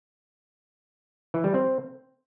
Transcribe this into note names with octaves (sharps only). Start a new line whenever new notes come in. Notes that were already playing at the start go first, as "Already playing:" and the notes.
E3
G3
C4